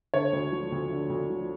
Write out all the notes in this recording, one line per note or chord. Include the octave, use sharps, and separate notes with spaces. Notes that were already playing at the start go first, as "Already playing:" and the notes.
D3 C#5
D2
F3
D2
D3
D2
F3